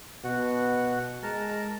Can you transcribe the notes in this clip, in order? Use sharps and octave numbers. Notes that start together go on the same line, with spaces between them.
B2 F#4 F#5
G#3 A#4 A5 A#5